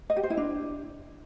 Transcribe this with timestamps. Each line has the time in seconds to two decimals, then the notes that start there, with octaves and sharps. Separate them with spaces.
0.10 D#5
0.17 G4
0.23 C5
0.30 E4
0.37 D4